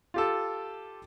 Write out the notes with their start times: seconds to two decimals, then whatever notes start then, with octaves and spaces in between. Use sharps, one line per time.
0.14 F4 G4 A4